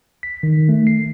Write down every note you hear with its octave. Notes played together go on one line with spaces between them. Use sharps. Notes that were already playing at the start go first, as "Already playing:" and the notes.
B6
D#3
A3
C7